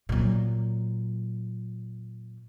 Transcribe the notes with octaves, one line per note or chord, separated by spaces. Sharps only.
A#2 F#3